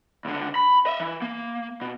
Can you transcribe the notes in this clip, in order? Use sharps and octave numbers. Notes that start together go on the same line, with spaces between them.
C#2 D3
B5
D#5 E5
E3
A#3
B2